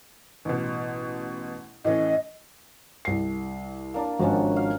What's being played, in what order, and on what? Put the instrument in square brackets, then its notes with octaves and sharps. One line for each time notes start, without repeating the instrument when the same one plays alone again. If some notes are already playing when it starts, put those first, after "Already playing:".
[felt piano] A1 B2
[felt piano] A2 E3 C#4 [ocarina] D#5
[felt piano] C2 C7
[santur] A#3 D4
[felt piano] G#1 F3 D4 [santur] C#4 F#4
[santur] F5